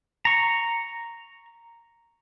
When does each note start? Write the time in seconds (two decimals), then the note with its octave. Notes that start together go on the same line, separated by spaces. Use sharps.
0.25 A#5 C#6